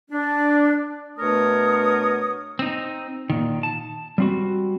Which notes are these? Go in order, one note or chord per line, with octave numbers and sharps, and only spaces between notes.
D4
B2 A3 D4 A#4 C#5 D#6
C4 D#4
A#2 D#3
A5
G3 C4 F#4